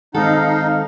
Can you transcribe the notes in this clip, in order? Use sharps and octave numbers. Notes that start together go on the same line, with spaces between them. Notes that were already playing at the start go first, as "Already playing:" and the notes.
D#3 G#3 C4 D#4 A4 F5